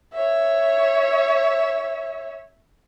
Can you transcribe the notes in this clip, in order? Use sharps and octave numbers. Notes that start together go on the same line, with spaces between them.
C#5 E5